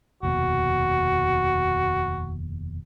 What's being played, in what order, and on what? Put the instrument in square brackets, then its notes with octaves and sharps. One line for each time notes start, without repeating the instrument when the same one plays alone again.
[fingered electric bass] F1 D#2 B2 [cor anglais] F#4